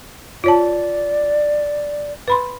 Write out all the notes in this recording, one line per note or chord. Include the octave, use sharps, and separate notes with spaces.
F4 C#5 D5 A5
B4 B5 C6